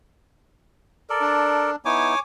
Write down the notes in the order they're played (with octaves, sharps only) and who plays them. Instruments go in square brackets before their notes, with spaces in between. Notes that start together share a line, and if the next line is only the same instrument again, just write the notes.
[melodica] A4 A#4 D5
[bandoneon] D4
[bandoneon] B3 D#4 E4 [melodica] C#5 G#5 D6